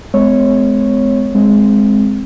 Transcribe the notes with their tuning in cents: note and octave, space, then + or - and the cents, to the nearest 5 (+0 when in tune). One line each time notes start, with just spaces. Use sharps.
G#3 +30 C4 -40 C#5 -10
G#3 +0 C4 +0